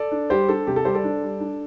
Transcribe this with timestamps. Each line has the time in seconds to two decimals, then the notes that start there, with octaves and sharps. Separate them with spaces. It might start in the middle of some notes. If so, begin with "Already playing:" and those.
Already playing: A4 D5
0.11 D4
0.30 G3 G4 C5
0.49 D4 A4
0.67 C3 G4
0.76 A4
0.85 G3 G4 C5
0.95 A4 D5
1.04 D4
1.23 G3
1.40 D4